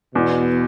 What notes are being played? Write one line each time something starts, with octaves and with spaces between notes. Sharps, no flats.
E2 B2